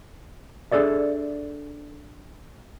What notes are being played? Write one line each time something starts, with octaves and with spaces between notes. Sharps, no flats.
D4 G#4 A4 D5 E5